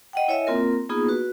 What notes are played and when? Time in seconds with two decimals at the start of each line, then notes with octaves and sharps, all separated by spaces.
0.13 D#5 F#5 G5
0.28 E4 C#5 D#5 E5 G#5
0.47 A#3 C4 F4 A#4
0.89 A#3 B3 D#4 F4 G#4
1.09 F#4 B4